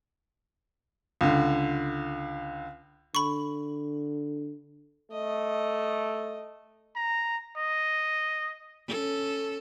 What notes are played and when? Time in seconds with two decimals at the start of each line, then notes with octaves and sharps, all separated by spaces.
1.21 C#2 D3
3.15 D3 B5 C#6
5.11 A3 D#5
6.96 A#5
7.57 D#5
8.88 C#4 A4